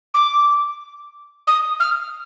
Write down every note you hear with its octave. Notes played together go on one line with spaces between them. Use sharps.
D6
D#6
F6